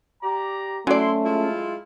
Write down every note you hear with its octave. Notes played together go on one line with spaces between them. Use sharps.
G4 D5 A#5
F#3 A3 C#4 E4 D5 C6
G#3 E4 F4